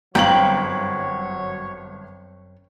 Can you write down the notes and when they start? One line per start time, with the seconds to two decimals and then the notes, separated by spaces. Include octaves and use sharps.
0.15 G1 F#2 F#3 C4 C#5 F5 G5 F#7